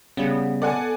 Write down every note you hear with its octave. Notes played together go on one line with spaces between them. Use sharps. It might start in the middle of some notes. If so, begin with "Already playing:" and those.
C#3 G3 B3
A4 D5 F#5 G#5